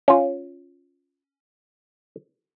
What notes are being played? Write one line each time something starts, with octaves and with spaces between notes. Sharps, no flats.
C#4 F4